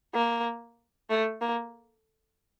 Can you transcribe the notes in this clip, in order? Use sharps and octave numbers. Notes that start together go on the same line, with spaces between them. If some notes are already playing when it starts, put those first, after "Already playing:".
A#3
A3
A#3